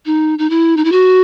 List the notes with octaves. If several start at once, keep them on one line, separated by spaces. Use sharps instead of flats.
D#4
D#4
E4
D#4
E4
F#4